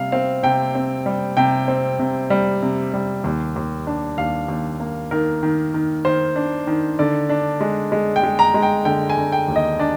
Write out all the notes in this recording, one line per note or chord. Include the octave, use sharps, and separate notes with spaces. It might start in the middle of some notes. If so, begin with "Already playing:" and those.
Already playing: C3 G3 F5
C4 F5
C3 G5
C4
G3
C3 G5
C4
C3
G3
C3
G3
D#2
D#2
D4
D#2 F5
D#2
A#3
D#3 A#4
D#3
D#3
D#3 C5
D4
D#3
D3 D5
D4
G#3
G#3
G5
G#3
A#5
G#3
G5
D3 G5
G#5
D3
G5
D#2
D#5
D4 D5